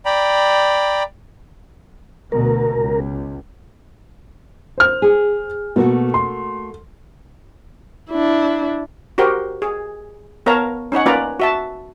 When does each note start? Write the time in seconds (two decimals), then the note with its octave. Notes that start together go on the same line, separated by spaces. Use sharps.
0.05 D5 G5 A#5 B5
2.32 D2 B2 A#4
2.77 C#2
4.78 C5 F6
5.02 G#4
5.76 B2 A3 A#3 F#4
6.14 C6
8.10 D4 E4
9.18 F#4 G4 A#4 C5 G5
9.62 G#4
10.46 B3 A#4 C#5 F5 A5 A#5
10.92 C#4 D#4 C#5 F#5
11.06 A#3 C#4 F4 B4 D5 A#5
11.40 F#4 E5 A5